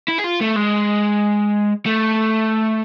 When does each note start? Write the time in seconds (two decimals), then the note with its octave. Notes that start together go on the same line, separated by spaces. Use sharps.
0.08 E4
0.18 G#4
0.24 F4
0.41 A3
0.56 G#3
1.86 A3